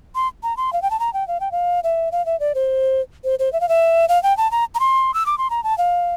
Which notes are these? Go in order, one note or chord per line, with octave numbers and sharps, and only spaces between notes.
C6
A#5
C6
F5
G5
A5
A#5
G5
F5
G5
F5
E5
F5
E5
D5
C5
C5
C5
E5
F5
E5
F5
G5
A5
A#5
A#5
C6
E6
D6
C6
A#5
A5
F5